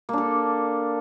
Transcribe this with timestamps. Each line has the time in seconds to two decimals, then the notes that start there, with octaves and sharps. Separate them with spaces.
0.09 A#3
0.13 D4
0.18 A4